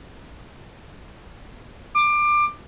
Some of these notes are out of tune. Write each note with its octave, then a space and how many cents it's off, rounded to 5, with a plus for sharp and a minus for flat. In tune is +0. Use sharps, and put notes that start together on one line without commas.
D6 +20